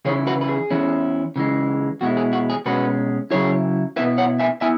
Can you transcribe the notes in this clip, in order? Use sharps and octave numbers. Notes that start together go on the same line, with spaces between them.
C#3 E3 C#4 E4 G#4 C#5
F#4 B4
B4
G#4
E2 E3 C#4 E4
C#3 E3 G#3
E2 B2 G#3 E4 F#4
G#4
F#4
G#4
B2 G#3 C#4 F#4 B4
C#3 F#3 E4 G#4 C#5
B2 B3 E4 B4 E5
C#5 F#5
E5 G#5
B3 E4 E5 G#5